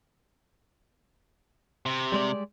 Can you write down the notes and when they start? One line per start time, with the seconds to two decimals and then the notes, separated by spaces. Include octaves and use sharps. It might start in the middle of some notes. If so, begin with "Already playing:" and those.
1.86 C3
2.12 G3 G#3 D5